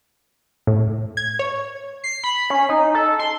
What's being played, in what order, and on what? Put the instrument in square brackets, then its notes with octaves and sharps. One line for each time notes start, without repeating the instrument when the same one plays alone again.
[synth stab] A2
G#6
C#5
[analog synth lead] C7
B5
C#4
D#4
A4
C6